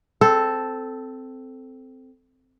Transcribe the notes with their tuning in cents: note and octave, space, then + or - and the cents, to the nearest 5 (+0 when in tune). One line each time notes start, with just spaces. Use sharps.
C4 -10 A4 +0